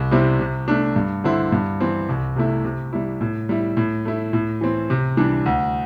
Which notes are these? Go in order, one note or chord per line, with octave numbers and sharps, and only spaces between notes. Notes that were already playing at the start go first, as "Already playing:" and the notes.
Already playing: C2
C3 G3 C4 E4
C3
A3 D4
G2
D3 C4 E4
G2
E3 C4
C2
C3 A3 E4
C3
G3 E4
A2
G3 E4
A2
A3 E4
A2
E3 C4
C3
E3 G3 D4
D2